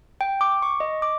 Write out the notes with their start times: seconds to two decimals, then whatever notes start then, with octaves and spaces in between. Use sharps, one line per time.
0.21 G5
0.41 D6
0.62 C#6
0.80 D#5
1.02 D6